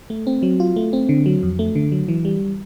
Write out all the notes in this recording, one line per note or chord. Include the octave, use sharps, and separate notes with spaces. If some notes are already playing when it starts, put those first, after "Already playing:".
A3
C4
F#3
F4
A3
C4
D3
F#3
F2
A3
D3
F#3
E3
G3